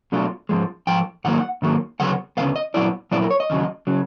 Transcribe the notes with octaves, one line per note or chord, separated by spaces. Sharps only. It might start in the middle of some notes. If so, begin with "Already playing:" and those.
B2 F#3 A3 D4 F4
G#2 F3 G#3
G#2 F3 G5
G#2 D#3 F#3 A#3 F#5
G#2 D#3 F#3 A#3
D2 C#3 F#3 B3 F#5
D2 C#3 F#3 B3 F5
D#5
A#2 F#3 B3 E4 D5
A#2 F#3 B3 E4 D5
A#4
C#5
D#5
D#2 C#3 F#3
C#3 F#3